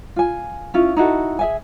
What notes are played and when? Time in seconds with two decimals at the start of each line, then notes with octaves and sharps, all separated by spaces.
0.16 F4 G#5
0.74 C#4 E4 F4
0.97 D#4 E4 F#4 A4
1.39 G#4 E5 G#5